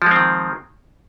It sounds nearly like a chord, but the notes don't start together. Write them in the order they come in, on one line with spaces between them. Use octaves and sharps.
F3 G#3 C4 D#3